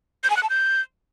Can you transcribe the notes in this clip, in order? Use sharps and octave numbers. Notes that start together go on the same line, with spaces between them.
G6
G#5
F#6
A5
G6